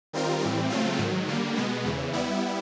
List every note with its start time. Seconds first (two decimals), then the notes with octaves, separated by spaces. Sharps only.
0.13 D#3 G3 C4 F4 A#4
0.42 A2 E3 G3 C4
0.70 C#3 F#3 A3 C4 F4
0.99 G#2 D#3 F#3
1.28 D3 G3 A#3
1.56 B2 G#3 B3
1.85 E2 C#3 E3
2.13 G3 B3 E4